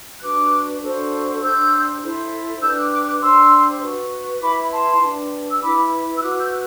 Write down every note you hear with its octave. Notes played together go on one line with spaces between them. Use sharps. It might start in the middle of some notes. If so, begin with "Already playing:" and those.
D4 F#4 B4 D6 F#6
D4 F#4 A4 C5
D4 G4 C5 E6 G6
E4 A4 C5
D4 G4 B4 E6 G6
D6 F#6
D6 F#6
D6 F#6
D4 G4 C5 C6 E6
F#4 B4
E4 B4 B5 D6
A5 C6
D4 G4 B4
E6
E4 B4 B5 D6
E6
F#4 B4 D6 F#6
E6 G6
F#6